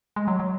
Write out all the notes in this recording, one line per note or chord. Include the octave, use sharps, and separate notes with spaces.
G#3
F#3
F#3